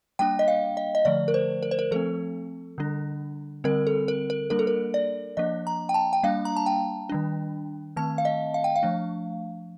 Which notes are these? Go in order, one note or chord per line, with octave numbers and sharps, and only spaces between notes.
G3 A#3 D4 G5
D#5
F5
D#5
D#5
D3 F3 A3 D5
A#4
C5
A#4
C5
A#4
F3 A3 C4 A4
D3 G3 D4
D3 G3 C4 A#4
A4
A#4
A#4
G3 A#3 D4 A#4
A4
A#4
D5
F3 A#3 D4 D#5
A#5
G5
A5
G5
G3 A#3 D4 F5
A#5
A5
G5
D#3 G3 D4
D#3 A3 C4 A5
F5
D#5
F5
G5
F5
F3 A3 D4